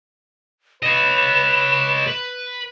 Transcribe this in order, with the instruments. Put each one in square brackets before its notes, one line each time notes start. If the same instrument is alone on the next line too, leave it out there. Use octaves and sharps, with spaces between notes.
[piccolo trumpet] B4 [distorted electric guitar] C#5 D#5 [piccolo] E7
[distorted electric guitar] B4